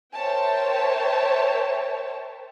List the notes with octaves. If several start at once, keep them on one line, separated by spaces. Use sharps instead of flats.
A#4 C5 C#5 E5 G5 A5